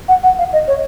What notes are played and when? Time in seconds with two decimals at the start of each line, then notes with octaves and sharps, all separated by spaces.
0.08 F#5
0.23 F#5
0.38 F5
0.53 D#5
0.67 C#5